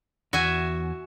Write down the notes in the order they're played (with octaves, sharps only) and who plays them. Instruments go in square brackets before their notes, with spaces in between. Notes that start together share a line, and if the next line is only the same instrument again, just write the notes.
[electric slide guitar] E2 [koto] F#4 E5 G#5